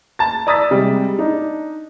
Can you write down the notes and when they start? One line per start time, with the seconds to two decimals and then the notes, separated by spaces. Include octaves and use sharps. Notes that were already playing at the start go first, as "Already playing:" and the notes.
0.19 A5 A6
0.47 D5 A#5 D#6 E6 A6 B6
0.71 C3 G3 G#3
1.19 D4 D#4